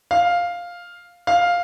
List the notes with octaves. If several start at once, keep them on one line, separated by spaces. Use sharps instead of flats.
F5
F5